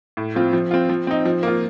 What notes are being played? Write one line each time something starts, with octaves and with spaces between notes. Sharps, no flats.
A2
F3 C4 F4
F3
C4 F4
F3
C4 D#4
F3
A#3 F4